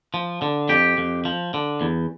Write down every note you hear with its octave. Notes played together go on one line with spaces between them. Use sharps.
F3
D3
F2 G4
F2
F3
D3
E2